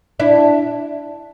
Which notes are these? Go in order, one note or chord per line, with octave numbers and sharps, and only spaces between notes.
D4 E4